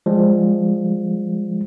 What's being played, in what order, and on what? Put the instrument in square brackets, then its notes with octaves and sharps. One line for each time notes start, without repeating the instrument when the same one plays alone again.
[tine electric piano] F3 G3 G#3